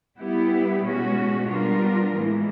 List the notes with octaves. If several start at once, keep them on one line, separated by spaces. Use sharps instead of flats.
G3 B3 E4 G4
B2 G#3 C#4 F#4
G3 B3 D4 F4 A#4
A2 E3 G#3